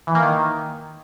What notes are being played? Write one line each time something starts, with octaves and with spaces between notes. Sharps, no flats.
E3
A#3
D#3